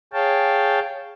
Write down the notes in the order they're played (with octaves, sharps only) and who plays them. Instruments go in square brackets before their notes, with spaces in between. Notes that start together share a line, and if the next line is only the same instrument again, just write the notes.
[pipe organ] G#4 C#5 F5 G5 A5